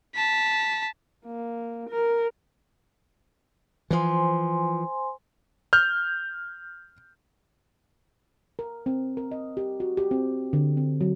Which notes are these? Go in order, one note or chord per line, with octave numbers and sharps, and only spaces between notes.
A5 B6
A#3
A#4
E3 F3 C5 G#5 C6
F6 G6
A#4
C4
A#4
D#5
G4
F#4
G4
C4
D3
C4
F#3